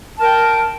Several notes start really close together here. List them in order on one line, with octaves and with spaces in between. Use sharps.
A5 A#4 G5